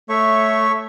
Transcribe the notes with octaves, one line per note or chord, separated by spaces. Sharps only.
A3 C#5 E5 C#6